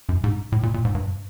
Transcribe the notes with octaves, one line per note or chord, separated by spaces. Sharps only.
F#2
G#2
A2
A#2
A#2
G#2
G2